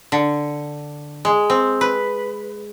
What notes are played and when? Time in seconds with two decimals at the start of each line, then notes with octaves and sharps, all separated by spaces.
0.12 D3
1.25 G#3
1.50 C4
1.81 B4